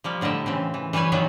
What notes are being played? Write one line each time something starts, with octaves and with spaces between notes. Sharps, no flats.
F3 G3 A#3
A2 D3 G3 D#5 E5
C#3 E3 C4
E3
E3 G3 B4 C#5 G#5
A#2 D#3 E3 F#3 G3 B3